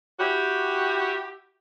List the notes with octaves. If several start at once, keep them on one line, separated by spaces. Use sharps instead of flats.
E4 F#4 G4